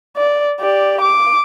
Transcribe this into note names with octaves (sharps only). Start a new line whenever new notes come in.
D5
G4 D5
D6